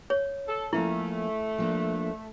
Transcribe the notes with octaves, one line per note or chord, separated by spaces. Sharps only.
C#5
A4
F3 A3 A#3 C#4 E4
F3 A#3 D4